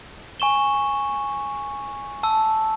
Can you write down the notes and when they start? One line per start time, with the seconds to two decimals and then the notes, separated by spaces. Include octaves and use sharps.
0.40 G#5 C#6 E7 G7
2.23 A5 E6